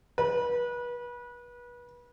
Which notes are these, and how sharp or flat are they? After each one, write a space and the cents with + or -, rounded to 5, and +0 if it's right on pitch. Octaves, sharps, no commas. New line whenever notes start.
B4 -30